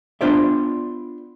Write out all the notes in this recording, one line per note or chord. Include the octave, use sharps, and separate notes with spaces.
B3 D4 F4 C5 D5 E5